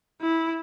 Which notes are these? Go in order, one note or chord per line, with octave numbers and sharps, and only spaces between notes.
E4